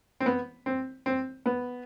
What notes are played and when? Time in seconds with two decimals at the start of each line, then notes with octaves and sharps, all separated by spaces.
0.20 C4
0.26 B3
0.66 C4
1.06 C4
1.46 B3